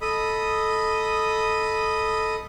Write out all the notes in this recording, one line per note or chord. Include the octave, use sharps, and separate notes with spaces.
A4 D#5 B5 D#6